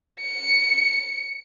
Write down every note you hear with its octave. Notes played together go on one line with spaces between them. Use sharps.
C#7